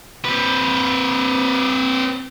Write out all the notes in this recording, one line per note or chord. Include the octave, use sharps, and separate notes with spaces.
C4 B4